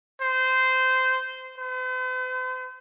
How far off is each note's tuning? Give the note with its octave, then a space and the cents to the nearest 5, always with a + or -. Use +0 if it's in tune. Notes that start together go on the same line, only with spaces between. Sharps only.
C5 -15
C5 -45